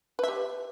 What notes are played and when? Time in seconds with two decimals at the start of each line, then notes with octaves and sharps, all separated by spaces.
0.19 B4
0.23 E5
0.28 G4